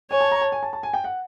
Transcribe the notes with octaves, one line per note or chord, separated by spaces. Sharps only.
C#5 G#5
A5
A#5
A5
G#5
A5
A5
G#5
G5
F#5